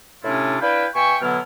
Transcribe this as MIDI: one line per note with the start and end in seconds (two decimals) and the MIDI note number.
0.24 0.57 45
0.24 0.57 48
0.24 0.57 61
0.24 0.57 62
0.24 0.57 64
0.24 0.57 65
0.61 0.86 62
0.61 0.86 64
0.61 0.86 71
0.61 0.86 77
0.61 0.86 79
0.95 1.16 47
0.95 1.16 76
0.95 1.16 79
0.95 1.16 80
0.95 1.16 85
1.22 1.39 47
1.22 1.39 50
1.22 1.39 54
1.22 1.39 59
1.22 1.39 64
1.22 1.39 89